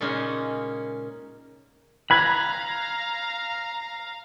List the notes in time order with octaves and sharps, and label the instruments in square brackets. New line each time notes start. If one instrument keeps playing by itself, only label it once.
[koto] A#2 C#3 G#3 A#3 C#4 D#4
[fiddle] F5 A#5 [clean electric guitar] B5 [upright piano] F#6 G#6